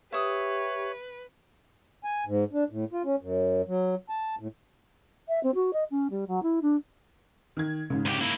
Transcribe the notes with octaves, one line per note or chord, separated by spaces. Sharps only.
G4 B4 C#5 E5 D#6
G#5
G#2
D4
A2
F4
C#4
F#2
F#3
A5
A2
E5
C4
F#4
D#5
C#4
G3
F#3
E4
D4
D#3 G#6
G#2 C#3
D2 G4
A#3 E4